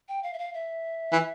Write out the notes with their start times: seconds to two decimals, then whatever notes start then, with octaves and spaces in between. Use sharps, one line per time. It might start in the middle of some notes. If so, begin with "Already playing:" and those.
0.09 G5
0.23 F5
0.33 E5
0.39 F5
0.54 E5
1.12 E3